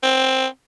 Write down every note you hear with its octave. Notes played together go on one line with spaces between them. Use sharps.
C4